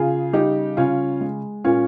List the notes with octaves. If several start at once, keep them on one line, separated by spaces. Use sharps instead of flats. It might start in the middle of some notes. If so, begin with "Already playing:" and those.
Already playing: C#3 F4 G#4
G3 D#4 G4
C#3 C#4 F4
G#3
A#2 C#4 F4